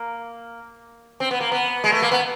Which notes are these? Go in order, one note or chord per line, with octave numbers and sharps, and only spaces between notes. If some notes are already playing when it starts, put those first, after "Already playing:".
Already playing: A#3
C4
B3
A#3
B3
G#3
A3
A#3
B3